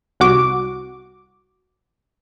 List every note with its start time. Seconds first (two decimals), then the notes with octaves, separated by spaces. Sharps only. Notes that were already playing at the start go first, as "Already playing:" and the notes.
0.20 C2 F#4 D6